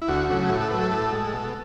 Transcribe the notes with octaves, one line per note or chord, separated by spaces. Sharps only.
E4
D2 F#4
C#3 F#3 A3
A2 F#4
A4
F#3 A3 B4
A4
A2 A4
G#3
B2